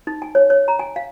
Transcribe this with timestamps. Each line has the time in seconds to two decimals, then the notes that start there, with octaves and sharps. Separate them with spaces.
0.07 D#4
0.22 G#5
0.35 C#5
0.50 C#5
0.68 A#5
0.79 G#5
0.96 F5